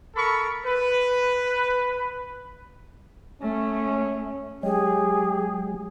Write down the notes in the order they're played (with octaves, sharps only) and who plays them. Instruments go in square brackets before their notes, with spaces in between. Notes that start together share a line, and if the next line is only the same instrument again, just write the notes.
[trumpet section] A4 A#4 B5 C#6
B4
[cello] A3 [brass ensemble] C#4
[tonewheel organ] F#3 G#3 [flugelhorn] G4 [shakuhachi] G#4